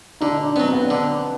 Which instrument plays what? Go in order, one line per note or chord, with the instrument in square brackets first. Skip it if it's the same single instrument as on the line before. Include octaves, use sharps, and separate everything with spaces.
[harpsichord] D3 [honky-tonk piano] D#4
[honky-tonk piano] D4
[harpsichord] F#3 B3 [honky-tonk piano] C4
[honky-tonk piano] B3
[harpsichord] D3